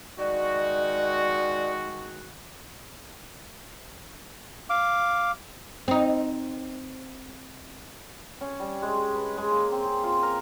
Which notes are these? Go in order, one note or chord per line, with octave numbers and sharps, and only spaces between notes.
D#3 G#3 F#4 D5
F5 D6
C4 D#4
C#4
G3
G#3
B4
G#3
A#3
C4
G#4
F4
A#4